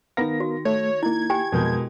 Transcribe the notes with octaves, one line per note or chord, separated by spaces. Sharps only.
D#3 B3 A#4 F5 A#6
F#4
A3 C#5
A#3 D#4 E4 G#6
G4 G5 G#5
F2 B2 G#3 A#4 G6